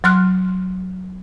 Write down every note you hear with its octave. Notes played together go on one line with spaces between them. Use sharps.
F#3 C6 F6 F#6